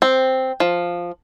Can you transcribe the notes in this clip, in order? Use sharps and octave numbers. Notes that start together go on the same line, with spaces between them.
C4
F3